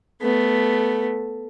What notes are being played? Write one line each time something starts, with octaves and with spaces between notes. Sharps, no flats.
A3 B3